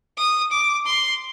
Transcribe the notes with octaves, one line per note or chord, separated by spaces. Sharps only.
D#6
D6
C6